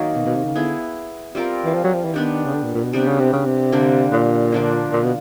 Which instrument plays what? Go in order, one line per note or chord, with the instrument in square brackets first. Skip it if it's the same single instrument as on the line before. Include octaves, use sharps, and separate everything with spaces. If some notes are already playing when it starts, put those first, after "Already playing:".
Already playing: [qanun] D#3 F#3 A#3 D#4
[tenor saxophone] B2
B2
C3
C#3
[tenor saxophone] D3 [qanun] B3 E4 G#4
[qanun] G3 C4 F4 A#4
[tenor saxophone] E3
F3
F#3
F3
E3
[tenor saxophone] D#3 [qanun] B3 D4 G4
[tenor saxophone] C#3
D3
A#2
A#2
B2
[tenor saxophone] C3 [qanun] G3 B3 D4 G4
[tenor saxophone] C#3
C3
C#3
C3
[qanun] D3 G3 A#3 D4
[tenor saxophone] A#2
[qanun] D3 F3 A#3 D4
[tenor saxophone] A#2
B2